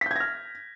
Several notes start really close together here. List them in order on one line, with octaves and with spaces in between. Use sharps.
B6 G6 G#6 A#6 F6